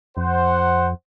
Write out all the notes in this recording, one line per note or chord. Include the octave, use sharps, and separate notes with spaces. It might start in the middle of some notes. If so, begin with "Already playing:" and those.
F2 C5 F#5